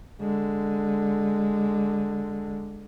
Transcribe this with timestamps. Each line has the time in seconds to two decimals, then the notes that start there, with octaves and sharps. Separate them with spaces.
0.20 D3 G#3